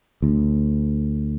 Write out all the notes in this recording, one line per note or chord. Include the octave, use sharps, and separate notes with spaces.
D2